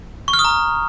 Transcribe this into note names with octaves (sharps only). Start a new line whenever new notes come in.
C#6
F6
D#6
A#5